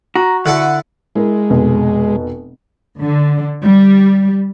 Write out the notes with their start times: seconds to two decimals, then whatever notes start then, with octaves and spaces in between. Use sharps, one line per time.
0.16 F#4 A#5
0.46 D3 E4 A4 F#5
1.16 G#3 E4 A#4
1.50 F1 B2
3.00 D3
3.63 G3